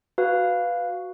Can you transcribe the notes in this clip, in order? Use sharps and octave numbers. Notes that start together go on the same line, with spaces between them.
F#4 B4 F5